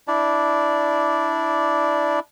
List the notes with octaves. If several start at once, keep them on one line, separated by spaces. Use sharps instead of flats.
D4 E4 D5